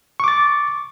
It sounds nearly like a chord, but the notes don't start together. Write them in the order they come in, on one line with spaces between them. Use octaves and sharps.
C#6 D6 A6